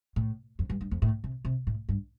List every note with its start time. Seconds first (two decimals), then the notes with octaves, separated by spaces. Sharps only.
0.16 A2
0.59 F2
0.70 G2
0.81 G2
0.91 F2
1.02 A2
1.24 C3
1.45 C3
1.67 A2
1.89 G2